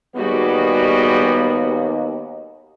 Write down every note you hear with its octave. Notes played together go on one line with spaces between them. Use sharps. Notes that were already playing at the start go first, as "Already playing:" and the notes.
D#2 G3 B3 F#4 G#4